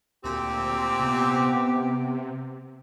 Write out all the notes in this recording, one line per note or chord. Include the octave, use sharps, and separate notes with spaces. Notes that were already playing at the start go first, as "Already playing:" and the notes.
D2 A#2 A#3 C4 G4
C3 B3